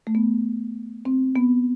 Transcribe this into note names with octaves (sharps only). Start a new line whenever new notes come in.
A3
B3
C4
B3